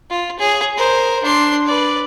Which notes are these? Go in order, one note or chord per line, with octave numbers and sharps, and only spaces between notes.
F4
G#4 C#5
A#4 C5
D4 C6
B4 D5